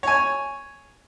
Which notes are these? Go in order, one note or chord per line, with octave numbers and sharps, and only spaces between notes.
C#5 G#5